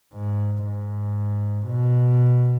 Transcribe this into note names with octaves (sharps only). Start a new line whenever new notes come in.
G#2
G#2
B2